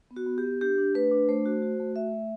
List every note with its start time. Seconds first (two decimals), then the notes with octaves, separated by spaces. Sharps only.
0.11 B3
0.16 F#4
0.27 B3
0.38 G4
0.45 B3
0.61 D4 G4
0.78 D4
0.95 A3 B4
1.11 D4
1.29 A3 C5
1.45 F#4
1.62 F#4
1.80 A3
1.95 A3 E5
2.14 A3